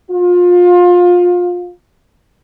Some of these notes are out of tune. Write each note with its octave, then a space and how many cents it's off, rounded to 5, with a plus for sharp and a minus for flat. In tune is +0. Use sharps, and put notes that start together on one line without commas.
F4 +25